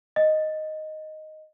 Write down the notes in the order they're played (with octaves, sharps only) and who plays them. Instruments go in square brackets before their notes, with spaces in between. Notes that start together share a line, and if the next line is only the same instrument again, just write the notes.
[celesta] D#5